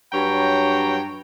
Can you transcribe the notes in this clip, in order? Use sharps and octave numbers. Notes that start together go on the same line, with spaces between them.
G2 F#3 C#5 G5 A#5